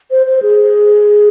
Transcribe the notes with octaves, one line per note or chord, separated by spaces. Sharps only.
C5
C5
G#4